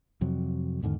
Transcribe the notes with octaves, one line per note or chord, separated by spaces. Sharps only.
F2 C3 F#3
E2 G#2 D3 D#3